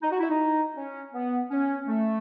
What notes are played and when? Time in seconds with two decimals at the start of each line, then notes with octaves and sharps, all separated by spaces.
0.01 D#4
0.11 F#4
0.20 E4
0.29 D#4
0.76 C#4
1.13 B3
1.51 C#4
1.87 A3